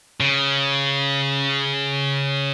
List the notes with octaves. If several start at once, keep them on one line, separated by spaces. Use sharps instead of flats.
C#3